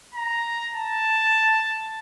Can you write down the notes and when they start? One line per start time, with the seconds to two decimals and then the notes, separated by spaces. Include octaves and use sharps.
0.14 A#5
0.74 A5